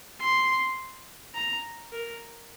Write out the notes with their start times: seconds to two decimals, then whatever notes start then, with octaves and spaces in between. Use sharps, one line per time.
0.21 C6
1.35 A#5
1.92 A#4